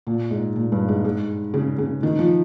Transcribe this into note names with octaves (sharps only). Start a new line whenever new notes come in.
A#2
G#2
A#2
G2
G#2
G#2
C#3
C#3
D#3
F3